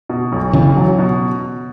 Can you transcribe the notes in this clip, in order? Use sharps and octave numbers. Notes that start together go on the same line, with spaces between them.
B2
B1
B1 C#3 E3
F#3
B2